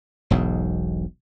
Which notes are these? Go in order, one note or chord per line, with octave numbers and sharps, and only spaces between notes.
E1 B1 G#2